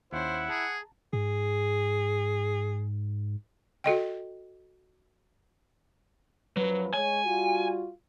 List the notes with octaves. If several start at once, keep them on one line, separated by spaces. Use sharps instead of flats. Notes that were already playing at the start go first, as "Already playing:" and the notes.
D#2 C#4 E4 C5 F#5
G#4 A5 A#5
G#2 G#4
F#4 A4 D#5 G5
F#2 F3 F#3 B4
G#3 C#5 G#5
G3 F4 F#4